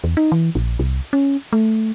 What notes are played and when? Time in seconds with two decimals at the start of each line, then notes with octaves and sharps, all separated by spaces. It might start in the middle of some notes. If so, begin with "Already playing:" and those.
0.04 E2
0.17 D#4
0.32 E3
0.55 A#1
0.79 C2
1.13 C#4
1.53 A3